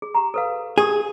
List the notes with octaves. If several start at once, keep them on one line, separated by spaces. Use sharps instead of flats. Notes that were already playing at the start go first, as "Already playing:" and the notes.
G#4
G4 A#5
A4 B4 F5
G4 G#4 A#4